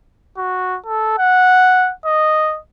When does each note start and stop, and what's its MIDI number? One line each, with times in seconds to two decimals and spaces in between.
0.37 0.77 66
0.86 1.16 69
1.18 1.91 78
2.06 2.58 75